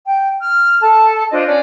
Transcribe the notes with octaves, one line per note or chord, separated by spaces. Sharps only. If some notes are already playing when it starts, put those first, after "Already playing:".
G5
F6
A4 A5
D4 F4 C5 D#5
C#4 D5